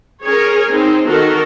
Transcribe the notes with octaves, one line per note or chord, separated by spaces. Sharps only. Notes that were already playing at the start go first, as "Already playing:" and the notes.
C#4 G#4 A#4 C#5
C4 D#4
D#3 F#4 A4 A#4